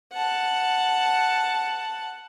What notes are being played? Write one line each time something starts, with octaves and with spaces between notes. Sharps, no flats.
F#5 A5